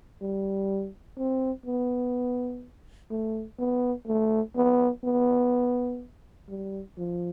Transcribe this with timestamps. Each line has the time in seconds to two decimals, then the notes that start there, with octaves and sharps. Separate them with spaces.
0.21 G3
1.18 C4
1.66 B3
3.11 A3
3.59 B3
4.07 A3
4.56 B3
5.04 B3
6.48 G3
6.97 F3